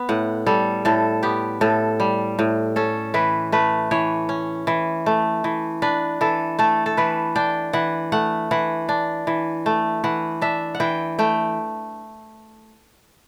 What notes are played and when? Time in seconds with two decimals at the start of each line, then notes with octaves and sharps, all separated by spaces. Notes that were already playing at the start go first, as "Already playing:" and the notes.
Already playing: B3
0.09 A2 F#5
0.46 G3 A4
0.85 A2 A4
1.23 B3 G4
1.61 A2 A4
2.00 G3
2.39 A2
2.76 C#4 A4
3.14 E3 B4
3.52 A3 B4
3.91 E3 C#5
4.29 C#4
4.67 E3
5.06 A3
5.44 E3
5.82 D4 B4
6.21 E3 A4
6.59 A3 A4
6.86 A4
6.97 E3 B4
7.36 D4 G5
7.73 E3 F#5
8.12 A3 F#5
8.51 E3 F#5
8.89 D4
9.27 E3
9.66 A3
10.04 E3 F#5
10.42 D4 E5
10.75 F#5
10.80 E3 G5
11.19 A3 G5